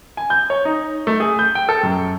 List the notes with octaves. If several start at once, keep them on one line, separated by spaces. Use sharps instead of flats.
G#5
G6
C#5
D#4
A3
G#4
G6
G5
A4
F#2